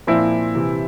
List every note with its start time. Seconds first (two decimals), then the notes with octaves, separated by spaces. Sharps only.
0.07 A#2 F3 C4 E4
0.55 C3 E3